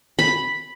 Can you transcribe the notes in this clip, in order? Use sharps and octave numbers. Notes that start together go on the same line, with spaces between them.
B5